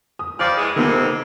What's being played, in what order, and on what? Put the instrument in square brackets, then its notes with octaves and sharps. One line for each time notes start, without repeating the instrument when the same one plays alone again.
[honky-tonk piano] D#6
[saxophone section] G2 F3 D5 [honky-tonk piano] F6
[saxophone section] E3 G#3
[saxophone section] F2 G#2 C3 [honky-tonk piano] D#3 B3